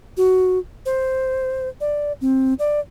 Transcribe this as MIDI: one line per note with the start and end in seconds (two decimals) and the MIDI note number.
0.17 0.59 66
0.86 1.69 72
1.80 2.12 74
2.21 2.54 60
2.59 2.80 74